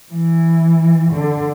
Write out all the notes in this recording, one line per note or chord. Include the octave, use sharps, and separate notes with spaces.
E3
D3